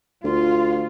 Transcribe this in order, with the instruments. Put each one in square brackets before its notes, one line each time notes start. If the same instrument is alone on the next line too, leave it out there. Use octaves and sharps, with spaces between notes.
[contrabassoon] D2 [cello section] F4